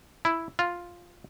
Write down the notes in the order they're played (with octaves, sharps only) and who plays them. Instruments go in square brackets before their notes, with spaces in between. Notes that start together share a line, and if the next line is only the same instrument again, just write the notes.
[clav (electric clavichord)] E4
F4